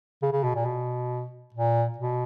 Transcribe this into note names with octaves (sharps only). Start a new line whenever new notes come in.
C#3
C#3
B2
A#2
B2
A#2
B2